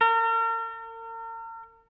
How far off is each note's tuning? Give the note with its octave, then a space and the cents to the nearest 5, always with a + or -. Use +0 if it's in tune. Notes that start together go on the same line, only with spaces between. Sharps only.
A#4 -40